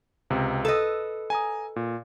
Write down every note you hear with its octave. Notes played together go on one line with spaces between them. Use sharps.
C#2 C3
A4 B4 D#5 E6
G#5 A#5 D#6
A#2